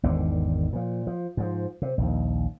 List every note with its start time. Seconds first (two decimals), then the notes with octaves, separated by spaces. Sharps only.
0.03 G#1 E2 D3 D#3
0.73 A#2 F3
1.07 F3
1.37 G#2 F3
1.82 C3
1.98 A#1 D#2